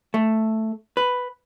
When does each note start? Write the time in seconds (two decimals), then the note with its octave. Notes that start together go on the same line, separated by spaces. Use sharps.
0.14 A3
0.97 B4